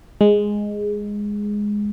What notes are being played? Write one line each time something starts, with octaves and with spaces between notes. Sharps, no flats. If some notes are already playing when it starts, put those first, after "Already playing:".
G#3